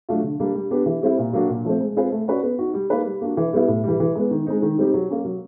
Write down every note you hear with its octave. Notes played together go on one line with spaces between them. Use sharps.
F#3 A3 D4 F4
D3
G3 A#3 D4
G3
B3 D4 G4
E3
G3 C4 E4
A#2
F#3 A#3 D4 F#4
A#2
F3 A3 C4
G#3
C4 F4 G#4 B4
A3
C#4 F#4 B4 D5
B3
D#4 F#4
G3
A#3 D#4 G#4 B4
G3
A#3 D4 F#4
E3
G3 B3 E4
A2
E3 G3
E3
G#3 B3
D#3
G#3 C4 D#4
D#3
G3 C4 D#4 G4
F#3
A#3 C#4
F#3